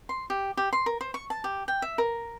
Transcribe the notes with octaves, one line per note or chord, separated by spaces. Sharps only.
C6
G4
G4
C6
A#4
C5
C#6
A5
G4
G5
E5
A#4